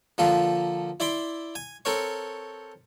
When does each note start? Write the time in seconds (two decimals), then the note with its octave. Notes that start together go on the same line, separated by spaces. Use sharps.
0.18 D3 F3 A#3 A4
1.00 E4 D5 B5 C6 D6
1.55 G#5
1.85 C4 A4 A#4 C#5 C#6